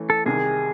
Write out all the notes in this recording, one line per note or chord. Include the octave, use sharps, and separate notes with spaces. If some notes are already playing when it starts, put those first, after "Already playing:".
Already playing: E3 A3 C#4 E4
A4
C2 C3 D#3 G#4